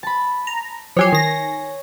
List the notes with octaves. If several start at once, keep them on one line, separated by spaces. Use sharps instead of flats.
A5 B5
A#5
F3 F#3 G4 C#5 G#5 C7
D#3 A#6